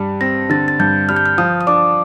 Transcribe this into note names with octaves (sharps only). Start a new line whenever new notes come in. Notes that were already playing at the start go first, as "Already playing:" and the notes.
Already playing: G2 G3
C4 A#6
D3 A6
A6
G2 G6
G3 F6
G6
F6
F3 D#6
D#6
D4 D6